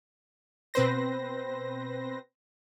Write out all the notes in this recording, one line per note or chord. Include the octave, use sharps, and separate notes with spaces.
B2 C4 B4 C5 A#6